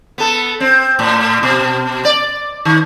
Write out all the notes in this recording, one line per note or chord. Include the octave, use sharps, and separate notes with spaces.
B3 A4
C4
A2
B2
D5
D#3